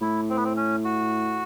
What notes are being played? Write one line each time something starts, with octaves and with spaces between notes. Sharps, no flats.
A2 E4
C4
B3
C4
C#4
F#4